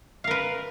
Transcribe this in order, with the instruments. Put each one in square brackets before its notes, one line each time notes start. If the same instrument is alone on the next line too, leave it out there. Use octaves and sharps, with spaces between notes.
[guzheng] F5
A#4
B4